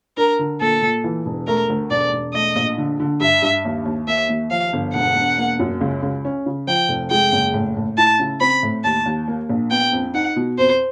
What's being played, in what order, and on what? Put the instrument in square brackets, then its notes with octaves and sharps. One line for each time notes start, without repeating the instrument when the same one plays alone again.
[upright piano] D4 [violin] A#4
[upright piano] D3
[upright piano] A#2 [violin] A4
[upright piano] A#2
E3
E1
[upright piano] A3 [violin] A#4
[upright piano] D2
[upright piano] E1 [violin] D5
[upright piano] E1
[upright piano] A3 [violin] D#5
[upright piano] A#1
D3
D3
[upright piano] G2 [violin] E5
[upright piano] G2
D#2
D#2
[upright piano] A#3 [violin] E5
[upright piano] D#2
[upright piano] F3 [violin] F5
[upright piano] G1
[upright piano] E1 [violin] F#5
[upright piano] E1
A#3
F#2
C#2
C#2
C#4
C#3
[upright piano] F3 [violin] G5
[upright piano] F1
[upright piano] G#3 [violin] G5
[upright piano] F#1
A2
A2
[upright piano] E4 [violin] A5
[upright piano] C#3
[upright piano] C4 [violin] B5
[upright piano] A2
[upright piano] D#2 [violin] A5
[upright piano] D#2
A#3
A#1
[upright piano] B3 [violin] G5
[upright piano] F2
[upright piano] D#4 [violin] F#5
[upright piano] B2
[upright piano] F2 [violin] C5